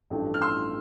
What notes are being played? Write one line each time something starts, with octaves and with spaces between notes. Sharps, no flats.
A1 G2 F3 A3
F6
C6 E6